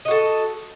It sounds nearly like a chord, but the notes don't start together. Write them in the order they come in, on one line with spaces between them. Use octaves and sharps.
D#5 F#4 A4